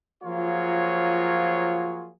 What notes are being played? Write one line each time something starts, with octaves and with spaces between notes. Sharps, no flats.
F3 F#3 A#3 F4 G#4 C#5